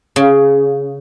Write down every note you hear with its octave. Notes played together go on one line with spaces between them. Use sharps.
C#3